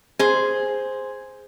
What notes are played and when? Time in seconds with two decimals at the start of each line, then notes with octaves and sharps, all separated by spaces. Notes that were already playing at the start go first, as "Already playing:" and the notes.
0.19 G#4 C5